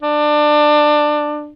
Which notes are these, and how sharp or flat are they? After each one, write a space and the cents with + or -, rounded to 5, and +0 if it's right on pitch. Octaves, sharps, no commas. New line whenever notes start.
D4 +20